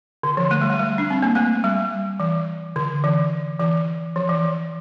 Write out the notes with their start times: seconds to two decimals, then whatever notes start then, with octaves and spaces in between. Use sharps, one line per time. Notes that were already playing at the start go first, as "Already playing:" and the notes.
0.23 D3
0.37 F3
0.51 A3
0.61 G3
0.70 A3
0.79 G3
0.98 D4
1.10 C4
1.22 A#3
1.35 A3
1.64 G3
2.20 E3
2.76 D3
3.04 E3
3.60 E3
4.16 F3
4.29 E3